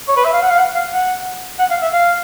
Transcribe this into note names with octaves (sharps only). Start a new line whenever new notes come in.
C#5
B4
E5
F5
F#5
F5
F#5
F5
F#5
F#5
F5
E5
F5